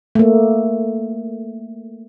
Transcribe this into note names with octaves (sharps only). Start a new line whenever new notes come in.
A3 A#3